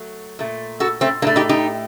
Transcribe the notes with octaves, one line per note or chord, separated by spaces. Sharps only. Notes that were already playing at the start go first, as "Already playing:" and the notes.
Already playing: F#3 A3
A#2 A3
F#4 A4
A3 C4
A2 A3 A#3 D4
D#4 G4
D#4 G4